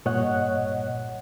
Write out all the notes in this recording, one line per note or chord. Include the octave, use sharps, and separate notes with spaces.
G2 A#2 C#5 D#5 F#5 F#6